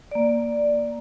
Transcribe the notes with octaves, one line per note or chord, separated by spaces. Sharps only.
A#3 D5